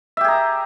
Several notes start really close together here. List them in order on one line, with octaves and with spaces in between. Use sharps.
E5 G4 G#4 A#5